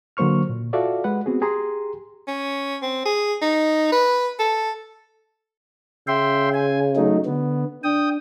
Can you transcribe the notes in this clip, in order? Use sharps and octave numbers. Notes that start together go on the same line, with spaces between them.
D3 F#3 A#3 C5 C#6 F6
A#2
F4 F#4 A4 D5 E5 F5
G#3 B4 F#5
B3 C4 F#4 G#4
G4 G#4 A#5 C6
C#4
C4
G#4
D#4
B4
A4
C#3 E5 G5 C6
G#5
F#3 A3 D#4
D3 B3
D4 G5 D#6